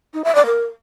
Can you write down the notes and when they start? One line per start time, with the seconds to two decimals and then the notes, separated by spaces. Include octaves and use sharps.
0.14 D#4
0.24 E5
0.35 D5
0.46 A#4